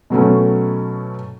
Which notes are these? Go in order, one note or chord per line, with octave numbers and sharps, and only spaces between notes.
B2 F#3 A3 C#4